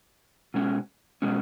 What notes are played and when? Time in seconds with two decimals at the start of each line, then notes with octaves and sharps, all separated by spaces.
0.54 B2 G#3 C#4
1.22 B2 G#3 C#4